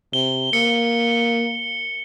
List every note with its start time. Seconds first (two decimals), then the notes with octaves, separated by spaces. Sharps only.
0.13 C3 G7
0.53 A#3 C#7